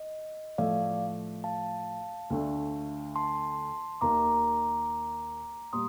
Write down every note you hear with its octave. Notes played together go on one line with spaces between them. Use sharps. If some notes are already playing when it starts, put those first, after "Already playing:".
Already playing: D#5
A2 F3 A3 D5 F5
F5 A5
D2 D3 A3 D4
A5 C6
D#2 D#3 A#3 A#5 D6
A#2 G3 C6 D#6